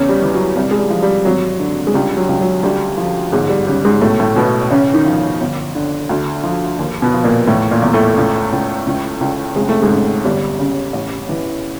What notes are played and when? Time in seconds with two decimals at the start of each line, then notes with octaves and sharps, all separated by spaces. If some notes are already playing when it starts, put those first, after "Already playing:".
Already playing: E2 C#3 C#4
0.09 G3
0.22 E3
0.33 F#3
0.56 C2 G3
0.71 G#3
0.79 G3
0.90 F3
1.02 G3
1.25 G#1 F#3
1.60 D3
1.87 G#3
1.94 C#2 G3
2.17 F#3
2.29 C#2
2.41 F#3
2.63 D2 G3
2.98 F3
3.32 G1 G#2 G#3
3.49 G3
3.67 C#3 G3
3.85 G#2 G#3
4.01 B1 A2 A3
4.20 A2 A3
4.36 B1 B2 B3
4.71 A1 C#3 C#4
4.94 D#3 D#4
5.06 F3
5.41 G1
5.75 D3
6.09 D2
6.43 F3
6.79 D#2
7.02 B2 B3
7.14 F3
7.24 A#2 A#3
7.47 E2 A2 A3
7.71 A#2 A#3
7.82 E2
7.94 A2 A3
8.17 C#2
8.52 C#2
8.87 C#2
9.21 C#2
9.55 F1 G#3
9.69 A3
9.82 G#2 G#3
9.89 C#3
10.25 G1 G3
10.59 C#3
10.93 A1
11.29 E3